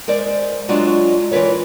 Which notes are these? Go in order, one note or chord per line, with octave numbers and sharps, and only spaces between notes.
G#3 A#4 C5 D5
F#3 G#3 D4 F4 F#4
E3 F4 A#4 B4 C#5